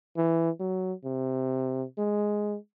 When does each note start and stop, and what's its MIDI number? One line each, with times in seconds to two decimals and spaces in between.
0.17 0.50 52
0.60 0.93 54
1.05 1.84 48
1.98 2.57 56